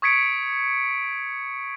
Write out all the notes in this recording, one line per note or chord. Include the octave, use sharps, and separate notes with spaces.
C#6 D#6 G#6 B6 C#7 D7